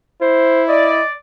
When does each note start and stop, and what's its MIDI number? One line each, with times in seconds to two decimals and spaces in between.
0.22 1.02 64
0.22 0.63 72
0.69 1.13 74
0.69 1.05 75